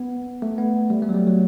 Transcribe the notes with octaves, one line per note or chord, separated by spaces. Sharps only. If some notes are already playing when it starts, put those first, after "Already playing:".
Already playing: B3
A3
B3
G3
A3
F#3
G3
F#3